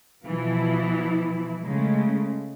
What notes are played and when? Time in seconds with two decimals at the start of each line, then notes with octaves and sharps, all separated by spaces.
0.25 B2 E3 F3 E4
1.64 C#3 G#3 A3